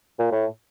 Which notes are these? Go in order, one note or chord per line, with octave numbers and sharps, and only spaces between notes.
A#2
A2